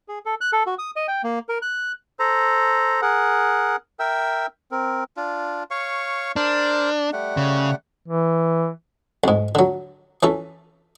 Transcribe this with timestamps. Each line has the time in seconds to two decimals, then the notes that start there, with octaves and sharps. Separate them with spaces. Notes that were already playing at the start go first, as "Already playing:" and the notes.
0.08 G#4
0.26 A4
0.41 F#6
0.53 A4
0.66 F#4
0.79 D#6
0.96 D#5
1.08 G5
1.24 A#3
1.49 A#4
1.62 F#6
2.19 A4 C5 A#5
3.02 G#4 A#4 F#5
3.99 A#4 E5 G5 E6
4.71 C4 A#4
5.17 D4 F4
5.71 C#5 F5 C#6
6.36 D4 A#4 C5
7.13 G3 A3 F#5
7.37 C#3
8.08 E3
9.24 B1 G#2
9.55 D3 F#3
10.23 E3 C#4 A4